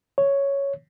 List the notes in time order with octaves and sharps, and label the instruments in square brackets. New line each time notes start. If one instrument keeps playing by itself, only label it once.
[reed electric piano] C#5